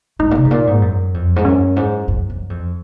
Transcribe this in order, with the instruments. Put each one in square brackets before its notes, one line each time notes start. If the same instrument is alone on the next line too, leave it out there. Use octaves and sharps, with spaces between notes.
[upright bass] G#2 [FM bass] D#4
[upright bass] A#2
C3
G#2
A#2
G#2
F#2
F2
G#2
[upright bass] F#2 [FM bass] C#4
[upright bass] G#2
F#2
F#2
F2